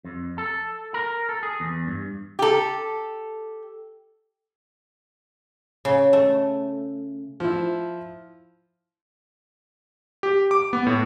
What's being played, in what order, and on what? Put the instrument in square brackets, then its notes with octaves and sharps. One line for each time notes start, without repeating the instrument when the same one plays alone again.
[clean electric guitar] F2
A4
A#4
A4
G#4
E2
G2
[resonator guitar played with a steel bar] G4 A4
[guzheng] C#3
A3
[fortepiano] F3 E4
[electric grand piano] G4
D6
B3
A2